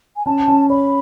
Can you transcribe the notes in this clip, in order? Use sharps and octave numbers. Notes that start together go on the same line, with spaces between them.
G#5
C#4 A5
C#4
C#5 B5